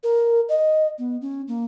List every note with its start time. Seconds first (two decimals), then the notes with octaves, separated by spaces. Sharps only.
0.03 A#4
0.49 D#5
0.98 B3
1.21 C#4
1.48 A#3